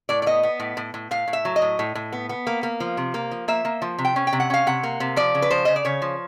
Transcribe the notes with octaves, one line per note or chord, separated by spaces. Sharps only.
A2 D5
D5
B3 D#5
B3
A2
A2
A2
A2 F5
A2
E5
F#3
D#5
A2
A2
A2
B3
B3
A#3
A#3
F3
C3
A#3
F3
A#3 E5
A#3
F3
C3
G5
C#4
G5
C3
F#5
C#4 F5
C3 F#5
A#3
C3
F3 D5
C#3
B4
F3 C5
C#3 D#5
D5
C#3 C#5
F3